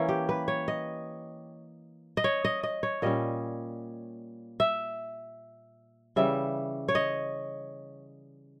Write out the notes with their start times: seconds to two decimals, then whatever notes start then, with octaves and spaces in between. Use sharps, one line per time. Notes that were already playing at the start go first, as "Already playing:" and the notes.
Already playing: E3 A#3 C#4
0.09 G4
0.29 B4
0.48 C#5
0.68 D#5
2.17 D#5
2.24 C#5
2.44 D#5
2.63 D#5
2.83 C#5
3.02 A#2 G3 C#4 D#5
4.60 E5
6.16 C#3 E3 G3 E5
6.88 C#5
6.95 D#5